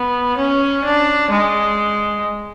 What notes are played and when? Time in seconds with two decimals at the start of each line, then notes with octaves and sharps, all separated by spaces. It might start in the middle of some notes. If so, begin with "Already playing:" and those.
Already playing: B3
0.38 C#4
0.85 D4
1.31 G#3